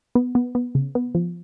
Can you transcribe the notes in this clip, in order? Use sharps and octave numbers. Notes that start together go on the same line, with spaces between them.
B3
B3
B3
C#3
B3
F3